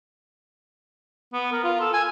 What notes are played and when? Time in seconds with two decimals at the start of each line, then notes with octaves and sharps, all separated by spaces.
1.33 B3
1.52 A#4
1.64 F4
1.81 A4
1.94 G#5